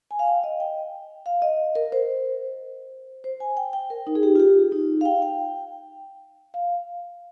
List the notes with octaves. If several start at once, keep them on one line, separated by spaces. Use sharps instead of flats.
G#5
F5
G5
D#5
G5
F5
D#5
A#4
C5
C5
G#5
G5
G5
A#4
D#4
G#4
G4
F4
G4
D#4
F5
G5
G5
F5